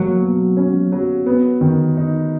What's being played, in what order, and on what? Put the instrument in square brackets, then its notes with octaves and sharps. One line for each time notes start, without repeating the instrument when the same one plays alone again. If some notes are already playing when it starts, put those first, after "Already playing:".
Already playing: [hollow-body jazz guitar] F#3 [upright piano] A#3
[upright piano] B2
C#4
F#3
B3
D#3
D#4